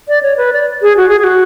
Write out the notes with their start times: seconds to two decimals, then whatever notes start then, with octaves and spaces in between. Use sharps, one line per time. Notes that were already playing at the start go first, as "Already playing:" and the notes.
0.08 D5
0.23 C#5
0.37 B4
0.53 D5
0.82 G#4
0.97 F#4
1.09 G#4
1.19 G#4
1.24 F#4